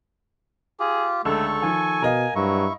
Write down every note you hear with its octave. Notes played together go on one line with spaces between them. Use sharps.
F4 G4 G#4
C#2 D3 A3 A4 C#6 E6
D#3 F3 G#5
B2 A#4 D#5 F5
G2 F#3 E4 C#6